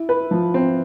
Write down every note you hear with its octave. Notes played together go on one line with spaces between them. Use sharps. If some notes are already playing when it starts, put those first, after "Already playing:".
Already playing: E4
B4
F3
C4